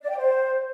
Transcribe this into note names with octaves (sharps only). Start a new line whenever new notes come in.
D5
G5
C5